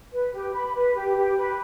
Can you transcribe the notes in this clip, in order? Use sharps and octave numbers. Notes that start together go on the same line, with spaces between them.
B4
G4
B5
B4
G4
G4
B4